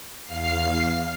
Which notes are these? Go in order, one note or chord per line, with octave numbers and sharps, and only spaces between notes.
E2 F5 F6 C7